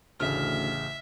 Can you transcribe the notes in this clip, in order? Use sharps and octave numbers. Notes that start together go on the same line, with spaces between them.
A1 D2 C#3 E5 F6